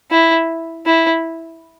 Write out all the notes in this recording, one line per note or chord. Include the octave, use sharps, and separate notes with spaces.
E4
E4